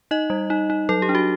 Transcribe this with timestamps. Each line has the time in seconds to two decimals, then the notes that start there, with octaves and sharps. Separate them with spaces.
0.11 D#4 D#5
0.30 G3
0.50 D#4
0.70 D#4
0.89 F#3 A4
1.02 G4
1.09 D4
1.15 F#4